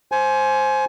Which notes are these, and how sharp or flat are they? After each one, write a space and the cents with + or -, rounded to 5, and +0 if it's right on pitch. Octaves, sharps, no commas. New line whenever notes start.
C5 +5 G#5 +25